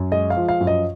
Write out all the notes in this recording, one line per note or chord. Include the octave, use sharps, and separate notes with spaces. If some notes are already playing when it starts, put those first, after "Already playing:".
Already playing: F#2
G#3 D#5
F5
F3
F5
F#2
D#5